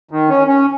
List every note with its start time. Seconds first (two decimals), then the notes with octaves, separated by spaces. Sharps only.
0.11 D#3
0.29 C#4
0.47 C#4